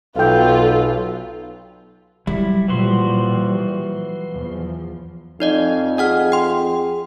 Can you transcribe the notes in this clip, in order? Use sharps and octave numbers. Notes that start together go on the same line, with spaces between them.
B1 F4 A4 B4 F5 G5
F#3 G3 E4
A#2 E3 F3 G3 F#4 C6
E2 F3
F2 D#4 D5 D#5
G#4 D#5 F#5 F6
G5 C6